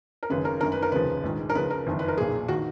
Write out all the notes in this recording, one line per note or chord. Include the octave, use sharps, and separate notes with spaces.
A#4
G#1 F#2 C#3 B4
A#4
G#1 F#2 D#3 A#4
B4
A#4
F1 D#2 C#3 F3 B4
A#1 G#2 D#3
A#4
C#2 C#3 F3 B4
A#4
F#1 F2 D#3
B4
A#4
B1 A#2 F3 G#4
D#3 F#4